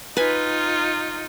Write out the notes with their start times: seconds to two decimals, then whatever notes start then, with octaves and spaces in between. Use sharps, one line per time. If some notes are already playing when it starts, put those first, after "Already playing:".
0.17 D#4 F4 B4 G#5